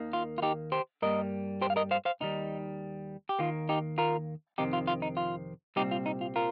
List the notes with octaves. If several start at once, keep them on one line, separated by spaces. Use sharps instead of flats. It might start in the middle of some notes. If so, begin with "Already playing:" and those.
Already playing: D#2 D#3 A#3
F4
F4
D#4 G4
G4 C5
G2 G3 A#3 A#4 D#5
G4 C5
F5
A#4 D#5
C5 F5
C5 F5
D#2 D#3 G3 D#4
G4
D#2 D#3 A#3 F4
D#4 G4
F4 A#4
F2 C3 D#3 C4 D#4 G4
F4
F4
D#4
F4
C2 A#2 G3 C4 D#4 G4
F4
D#4
F4
F4 A#4